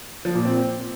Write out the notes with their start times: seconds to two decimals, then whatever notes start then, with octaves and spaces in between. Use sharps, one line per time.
0.25 F3
0.35 A#2
0.45 C4